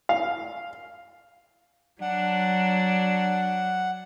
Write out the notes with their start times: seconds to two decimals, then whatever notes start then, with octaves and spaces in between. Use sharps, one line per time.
0.09 F5
2.02 F#3 D4 F#5